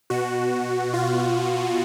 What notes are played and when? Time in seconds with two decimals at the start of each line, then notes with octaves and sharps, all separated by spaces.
0.10 B2 F#4
0.94 F4